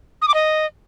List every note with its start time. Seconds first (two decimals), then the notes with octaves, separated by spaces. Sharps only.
0.22 D#6
0.28 D6
0.34 D#5